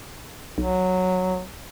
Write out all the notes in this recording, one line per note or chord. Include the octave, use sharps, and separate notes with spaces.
B1 F#3